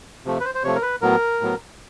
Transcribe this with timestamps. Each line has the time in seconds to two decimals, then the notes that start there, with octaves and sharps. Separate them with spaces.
0.25 C3 F3 A3
0.40 B4
0.45 C5
0.55 C5
0.64 C3 F3 A3 C#5
0.75 A#4
0.82 B4
1.02 A2 F#3 B3 A#4
1.41 A2 F#3 B3